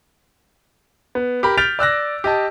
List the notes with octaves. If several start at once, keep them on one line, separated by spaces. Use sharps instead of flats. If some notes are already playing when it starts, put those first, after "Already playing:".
B3
G4 A#4 B5
F6 G6 A6 B6 D7 F7
D5 E6 F#6 A#6
G4 D#5 A5